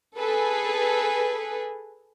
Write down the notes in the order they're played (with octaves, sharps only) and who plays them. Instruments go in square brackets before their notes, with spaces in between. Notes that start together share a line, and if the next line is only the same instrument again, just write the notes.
[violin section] G#4 A4 B4